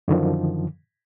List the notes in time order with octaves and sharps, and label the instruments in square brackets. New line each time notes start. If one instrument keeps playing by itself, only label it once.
[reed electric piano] F#2 D3 D#3 F3